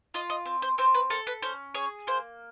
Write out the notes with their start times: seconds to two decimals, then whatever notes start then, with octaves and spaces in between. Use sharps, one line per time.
0.14 F4 D#5
0.30 D#5
0.45 C4
0.62 C5
0.78 C4 C5
0.94 B4
1.10 A4 A#4
1.27 B4
1.42 C#4 C5
1.74 G#4 C#5
2.07 A#3 C5